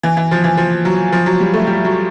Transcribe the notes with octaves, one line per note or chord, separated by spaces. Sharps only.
E3
E3
F3
E3
F3
F#3
F3
F#3
G3
A3
G3
F#3